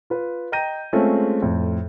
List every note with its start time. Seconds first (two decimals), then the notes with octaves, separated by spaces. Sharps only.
0.10 F4 B4
0.52 D#5 G5 A#5 G6 A#6 D#7
0.93 G#3 A3 C4 C#4 F4 G#4
1.42 F2 A2